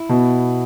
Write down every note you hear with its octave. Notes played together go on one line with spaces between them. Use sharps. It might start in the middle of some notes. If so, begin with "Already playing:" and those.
Already playing: E4
B2